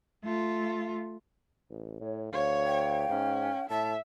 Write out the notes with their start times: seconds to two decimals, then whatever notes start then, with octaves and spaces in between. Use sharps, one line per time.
0.24 A3 F4
1.70 A1
2.01 A2 C#5
2.33 D2 C#5 F5
2.66 G5
3.09 G#2 C#4
3.70 A2 E5 A5